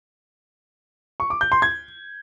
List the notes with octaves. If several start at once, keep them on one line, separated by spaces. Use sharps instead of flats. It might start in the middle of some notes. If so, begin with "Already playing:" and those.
C#6
D6
G6
C6
G#6